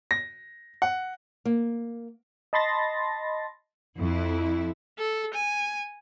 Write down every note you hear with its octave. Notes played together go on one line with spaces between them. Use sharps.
A#6
F#5
A#3
D#5 A5 B5 C6 A6 A#6
F2 E4
A4
G#5